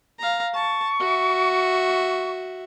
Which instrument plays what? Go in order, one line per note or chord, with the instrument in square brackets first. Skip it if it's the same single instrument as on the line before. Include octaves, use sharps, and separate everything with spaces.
[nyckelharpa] F5 A#5
[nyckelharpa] A5 [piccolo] C#6
[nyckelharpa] F#4 E5